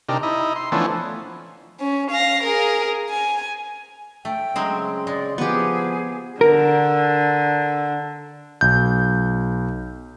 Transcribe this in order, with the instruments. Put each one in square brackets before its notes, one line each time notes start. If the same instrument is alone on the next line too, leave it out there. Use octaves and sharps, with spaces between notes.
[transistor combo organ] C3 D4 D#4 G4 A#4
D#4 E4 D#5
C6
E3 F3 A3 B3 C#4 D4
[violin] C#4
F5 A#6
G#4 A#4
G#5
[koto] A3 [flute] G5
[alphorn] C#3 [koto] F#3 G#3 C4
[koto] G#3 [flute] D5
[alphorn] F3 [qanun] B3 G4 [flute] G#4
[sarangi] D3 [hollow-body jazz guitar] A#4
[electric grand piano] B1 G6